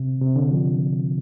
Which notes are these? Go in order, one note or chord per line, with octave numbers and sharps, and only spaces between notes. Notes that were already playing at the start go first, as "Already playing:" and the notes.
Already playing: C3
C3
D3
F3